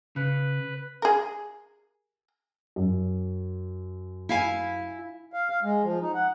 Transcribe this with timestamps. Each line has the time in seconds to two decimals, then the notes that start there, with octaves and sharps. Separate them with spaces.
0.16 C#3 B4
1.02 G#4 A#4
2.76 F#2
4.29 E4 F5 G#5
5.33 F5
5.50 F5
5.63 G#3
5.83 F3
6.01 D#4
6.14 F#5